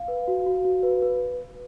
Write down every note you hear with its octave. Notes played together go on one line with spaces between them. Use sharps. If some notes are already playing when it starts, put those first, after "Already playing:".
Already playing: F5
B4
F#4
F#4
F#4
B4
B4